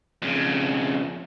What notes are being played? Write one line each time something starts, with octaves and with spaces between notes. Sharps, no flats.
F2 C#3